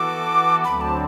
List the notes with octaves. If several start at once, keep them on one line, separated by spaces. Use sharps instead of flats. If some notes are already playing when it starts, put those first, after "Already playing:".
Already playing: E3 B3 F#4 A4 D6
D2 D3 F#3 C4 B5
A5